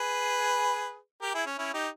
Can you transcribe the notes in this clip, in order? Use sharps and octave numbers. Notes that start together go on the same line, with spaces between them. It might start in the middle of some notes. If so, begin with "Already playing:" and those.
Already playing: G#4 B4
G4 A#4
E4 G#4
C#4
C#4 E4
D#4 G4